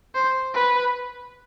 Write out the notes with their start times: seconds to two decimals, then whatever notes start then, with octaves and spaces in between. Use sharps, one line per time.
0.15 C5
0.55 B4